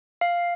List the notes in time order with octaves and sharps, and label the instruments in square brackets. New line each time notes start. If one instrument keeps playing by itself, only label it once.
[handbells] F5